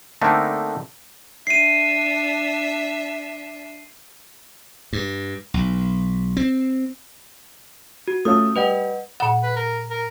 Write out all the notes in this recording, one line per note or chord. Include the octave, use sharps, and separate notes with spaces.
D3 A3 A#3 C4 D4 D#4
D4 E5 C7 D#7
G2
B1
C4
F#4
A3 C#4 F4 D#6
G3 B4 D#5 F#5
A#2 F#5
B4
A#4
A#4